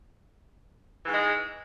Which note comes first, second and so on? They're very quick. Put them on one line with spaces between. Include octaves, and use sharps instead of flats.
E3 G#2 G#3